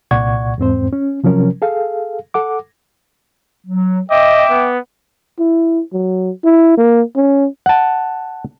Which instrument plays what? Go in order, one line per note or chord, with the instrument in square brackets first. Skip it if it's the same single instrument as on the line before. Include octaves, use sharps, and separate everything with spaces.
[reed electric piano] C2 A#2 D5 F#5 C#6 G#6
E2 G#2 C4 C5
C#4
C3 F3 F#3 C#4 A#4
G#4 A4 F5
A4 F#5 D6
[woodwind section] F#3
[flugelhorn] D#5 [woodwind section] E5 G5 D6
[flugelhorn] B3
[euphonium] E4
F#3
E4
A#3
C#4
[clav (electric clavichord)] F#5 A5